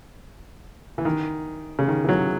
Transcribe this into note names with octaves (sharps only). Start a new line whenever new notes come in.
E3
D#3
C#3
D#3
E3
F#3